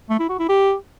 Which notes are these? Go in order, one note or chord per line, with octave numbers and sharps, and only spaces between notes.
A3
E4
F#4
E4
G4